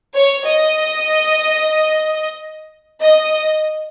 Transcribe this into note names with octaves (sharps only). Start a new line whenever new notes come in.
C#5
D#5
D#5